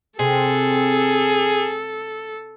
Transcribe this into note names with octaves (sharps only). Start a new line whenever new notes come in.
C3 G#4 A4